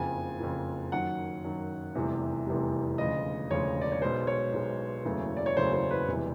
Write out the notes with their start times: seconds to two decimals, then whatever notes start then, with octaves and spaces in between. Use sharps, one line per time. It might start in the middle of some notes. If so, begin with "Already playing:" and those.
Already playing: F#1 F2 C#3 G#5
0.41 F#1 F2 C#3
0.92 F#2 D#3 F#3 F#5
1.44 F#2 D#3 F#3
1.95 F1 E2 C3 E3 G3
2.46 F1 E2 C3 E3 G3
2.98 E1 D2 C#3 F3 D#5
3.50 E1 D2 C#3 F3 C#5
3.81 D5
3.92 C#5
4.02 B1 B2 G#3 C5
4.27 C#5
4.53 B1 B2 G#3
5.05 F#1 E2 C#3 F#3 A3
5.37 D5
5.46 C#5
5.57 F#1 E2 C#3 F#3 A3 C5
5.73 C5
5.91 B4
6.08 E1 E2 C3 E3 G3